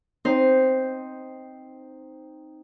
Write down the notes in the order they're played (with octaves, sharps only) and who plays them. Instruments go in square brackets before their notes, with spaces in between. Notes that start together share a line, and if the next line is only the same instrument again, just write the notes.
[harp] C4 D#4 C5